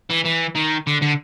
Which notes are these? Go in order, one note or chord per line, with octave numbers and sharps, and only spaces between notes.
E3
E3
D#3
D3
D3